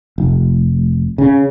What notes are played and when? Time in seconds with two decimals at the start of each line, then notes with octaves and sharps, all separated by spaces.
0.18 F1
1.18 C#3